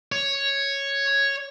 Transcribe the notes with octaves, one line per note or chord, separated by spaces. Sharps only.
C#5